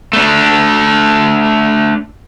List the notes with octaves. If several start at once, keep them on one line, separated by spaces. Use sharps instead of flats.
A3 D4